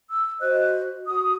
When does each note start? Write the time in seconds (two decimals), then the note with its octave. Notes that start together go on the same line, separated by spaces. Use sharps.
0.10 E6
0.40 F#4 C5 D#5 F#6
1.05 F#4 D#6